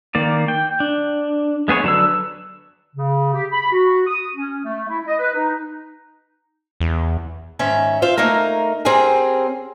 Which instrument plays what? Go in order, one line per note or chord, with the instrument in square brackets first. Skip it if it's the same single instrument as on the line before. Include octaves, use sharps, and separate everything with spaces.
[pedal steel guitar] D#3 A#3 D5
G5
D4
G#3 B3 G#4 C#5
D3 F#3 D4 B4 E6
[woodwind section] C#3
G4
B5
F#4
D#6
C#4
A3
E4
D#5
B4
D#4
[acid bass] E2
[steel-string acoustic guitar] G#2 D#3 C#4 E5
F4 C5 E5 F5
A3 A#3 D#4 A#4
C4 C#4 G4 G#4 A#4